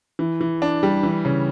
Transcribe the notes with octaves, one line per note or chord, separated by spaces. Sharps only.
E3
E3
D4
G3
E3
C#3